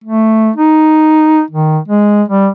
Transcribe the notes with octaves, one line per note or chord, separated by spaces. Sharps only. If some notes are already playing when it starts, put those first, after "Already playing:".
A3
D#4
D#3
G#3
G3